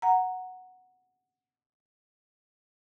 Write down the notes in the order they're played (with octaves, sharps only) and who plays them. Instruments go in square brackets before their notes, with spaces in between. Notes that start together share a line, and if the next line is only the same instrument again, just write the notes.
[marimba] F#5 A#5